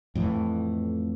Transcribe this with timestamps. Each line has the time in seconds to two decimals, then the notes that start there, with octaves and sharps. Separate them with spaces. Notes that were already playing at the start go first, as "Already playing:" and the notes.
0.15 F2 A2 E3